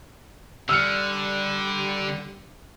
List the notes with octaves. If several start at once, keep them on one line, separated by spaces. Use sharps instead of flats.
D3 G3 E6 F6 C#7